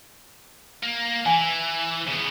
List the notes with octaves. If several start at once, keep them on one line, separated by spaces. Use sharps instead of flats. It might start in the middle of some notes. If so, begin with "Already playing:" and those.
A#3
E3 G#5
C#3 B3